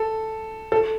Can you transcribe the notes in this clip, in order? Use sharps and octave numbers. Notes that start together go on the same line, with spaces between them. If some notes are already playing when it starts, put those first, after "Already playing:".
Already playing: A4
A4